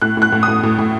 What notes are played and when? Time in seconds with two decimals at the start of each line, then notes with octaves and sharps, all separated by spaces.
0.02 A2 F#6
0.17 A2 F#6
0.32 A2
0.43 D#6
0.48 A2
0.63 A2
0.78 A2